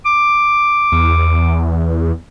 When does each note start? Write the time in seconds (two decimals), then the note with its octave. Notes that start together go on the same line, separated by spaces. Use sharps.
0.05 D6
0.92 E2